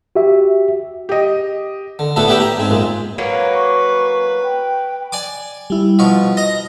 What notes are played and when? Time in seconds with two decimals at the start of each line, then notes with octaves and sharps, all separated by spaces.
0.16 F#4 G4 E5
1.09 G4 D#5
1.99 D3
2.16 A2 A3 B3 D4 F#4 A4
2.28 B3 E4 G4 D5 G5 A5
2.40 G5 A#5
2.57 G#2 C4
2.70 F#2 A#2 G#3
3.18 F#3 A#3 C#4 B4
3.54 C#6
4.44 G5
5.12 D5 G#5 D6
5.70 G3 E4
5.99 B2 F3 C#6
6.37 D#5 A#5 A#6